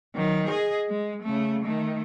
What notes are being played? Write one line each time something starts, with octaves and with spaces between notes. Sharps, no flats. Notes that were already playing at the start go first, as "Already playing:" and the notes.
D#3 F#3
G#4 D#5
G#3
C#3 A3
D#3 A3